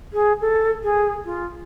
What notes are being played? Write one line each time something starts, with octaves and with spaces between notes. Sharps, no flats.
G#4
A4
G#4
F4